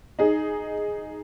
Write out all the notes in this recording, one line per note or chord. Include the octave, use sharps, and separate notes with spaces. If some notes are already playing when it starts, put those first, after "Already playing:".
D#4 G#4